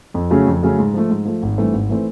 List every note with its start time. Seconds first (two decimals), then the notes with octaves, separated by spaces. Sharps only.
0.14 F2
0.30 C#3 F#3 A3 C#4
0.47 F2
0.63 C#3 F#3 A3 C#4
0.79 G#2
0.94 F3 A3
1.10 G#2
1.25 F3 A3
1.42 G#1
1.58 G2 E3 A3 C4
1.73 G#1
1.90 E3 A3 C4